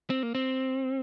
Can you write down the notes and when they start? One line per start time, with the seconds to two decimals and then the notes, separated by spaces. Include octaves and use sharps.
0.10 C4
0.23 A#3
0.35 C4